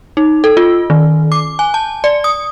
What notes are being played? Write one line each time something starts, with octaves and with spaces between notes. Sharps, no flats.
D#4
A4
F4
D#3
D6
G#5
A5
D5
D#6